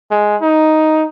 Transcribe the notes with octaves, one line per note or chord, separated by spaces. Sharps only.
G#3
D#4